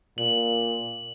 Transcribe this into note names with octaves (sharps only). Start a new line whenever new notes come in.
A#2 F#7